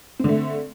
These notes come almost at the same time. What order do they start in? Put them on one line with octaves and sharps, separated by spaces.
C4 D3 A3